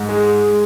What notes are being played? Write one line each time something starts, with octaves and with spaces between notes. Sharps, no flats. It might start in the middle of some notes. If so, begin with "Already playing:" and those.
Already playing: G#2
G#3